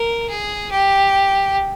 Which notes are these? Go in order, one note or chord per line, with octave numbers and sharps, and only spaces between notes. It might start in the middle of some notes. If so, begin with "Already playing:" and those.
Already playing: A#4
G#4
G4